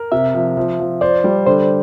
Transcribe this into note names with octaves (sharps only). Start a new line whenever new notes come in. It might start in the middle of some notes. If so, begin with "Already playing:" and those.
Already playing: A#4
C3 E5
F3
F3
F3
C5 D5
G3
D3 C5